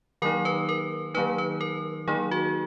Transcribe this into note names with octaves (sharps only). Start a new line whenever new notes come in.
D#3 F#3 A#3 D#4 A#4
B4
A#4
D#3 F#3 A#3 D#4 B4
B4
A#4
D#3 F#3 A#3 D#4 G#4
F#4